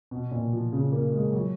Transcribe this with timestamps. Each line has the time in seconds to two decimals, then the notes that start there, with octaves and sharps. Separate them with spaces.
0.11 B2
0.31 A#2
0.52 F3
0.72 C#3
0.92 A#3
1.13 G#3
1.33 F#3